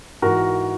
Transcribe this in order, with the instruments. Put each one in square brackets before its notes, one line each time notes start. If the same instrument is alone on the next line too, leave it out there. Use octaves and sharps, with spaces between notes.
[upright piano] G#2 E3 F#4 A#4